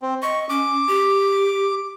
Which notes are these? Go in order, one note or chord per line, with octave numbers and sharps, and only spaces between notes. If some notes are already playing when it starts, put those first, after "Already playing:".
C4
D#5 C#6
C#4 D6
G4